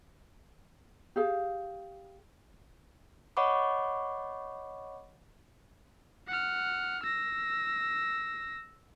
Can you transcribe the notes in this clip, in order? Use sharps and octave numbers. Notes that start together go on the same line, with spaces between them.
G4 G#4 F5
C#5 D#5 F#5 B5 C#6 D6
F#5 F6
E6 A#6